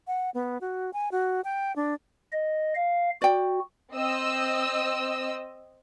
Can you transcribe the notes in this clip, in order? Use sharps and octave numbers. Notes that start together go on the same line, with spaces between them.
F#5
B3
F#4
G#5
F#4
G5
D4
D#5
F5
F#4 D5 G5
C4 D#5 E6